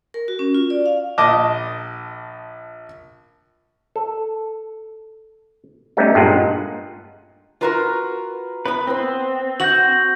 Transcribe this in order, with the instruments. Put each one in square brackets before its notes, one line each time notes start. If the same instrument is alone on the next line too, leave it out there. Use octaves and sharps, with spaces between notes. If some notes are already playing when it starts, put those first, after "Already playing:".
[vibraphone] A#4
F#4
C#4
F4
D5
F5
[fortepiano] A#1 D#5 A5 D6
[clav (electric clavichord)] A4
G3 A3 B3 C#4 D#4
G2 A#2 G#3 D#4 F4 F#5
[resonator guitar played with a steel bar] F4 F#4 A#4 [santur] B4 A#5 C6
[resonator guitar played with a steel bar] B3 [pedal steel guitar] B4 [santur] B5 D#6
[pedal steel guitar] C4 [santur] B4 C6
[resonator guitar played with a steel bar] F#4 F#5 [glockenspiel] G6 A#6 F#7